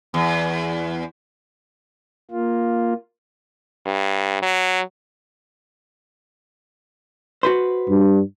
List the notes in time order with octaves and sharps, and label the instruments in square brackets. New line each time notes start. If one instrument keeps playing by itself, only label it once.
[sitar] E2
[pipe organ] A#3 F4
[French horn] G2
F#3
[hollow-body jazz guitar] F#4 B4 C5
[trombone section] G2